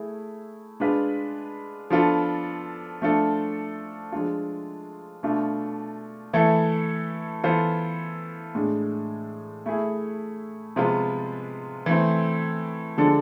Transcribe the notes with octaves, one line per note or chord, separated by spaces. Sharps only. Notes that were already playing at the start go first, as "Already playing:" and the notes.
Already playing: A3 E4 G#4
G#3 D4 F4 B4
F3 B3 D4 F4 A4
F3 A3 D4 F4 A4
F3 G#3 D4 F4
B2 A3 D4 F4
E3 A3 E4 A4
E3 B3 F4 A4 C5
A2 G#3 D4
A3 E4 G#4
C3 F3 G#3 B3 F4
E3 A3 C4
D3 F3 G#3 D4 A4